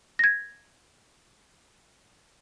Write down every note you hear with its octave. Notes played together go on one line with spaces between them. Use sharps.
G#6 A#6